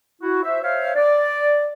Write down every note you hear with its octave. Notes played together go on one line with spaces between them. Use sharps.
E4 F#4
C5 E5
C5 C#5 E5 F5
D5